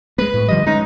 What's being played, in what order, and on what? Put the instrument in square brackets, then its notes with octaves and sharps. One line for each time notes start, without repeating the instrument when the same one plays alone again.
[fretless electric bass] G#3 A#3 [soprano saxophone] B4
[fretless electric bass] A2
[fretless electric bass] D3 F3 G3 [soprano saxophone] D#5
[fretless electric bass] G#3 C#4 [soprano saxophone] D#4